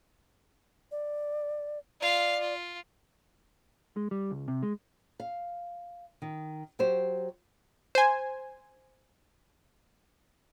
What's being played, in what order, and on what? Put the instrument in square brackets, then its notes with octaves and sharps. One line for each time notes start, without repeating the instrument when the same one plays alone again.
[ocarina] D5
[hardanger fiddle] F4 F5 [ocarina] D5
[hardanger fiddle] F4
[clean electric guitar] G#3
G3
C#2
C3
G#3
[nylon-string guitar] F5
D#3
F#3 G4 C5
[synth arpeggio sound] C5 G#5